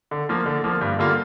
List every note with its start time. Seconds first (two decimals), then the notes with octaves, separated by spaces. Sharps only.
0.11 D3
0.29 F3 A#3 F4
0.46 D3
0.64 F3 A#3 F4
0.81 G2
0.99 D3 G3 A#3 F4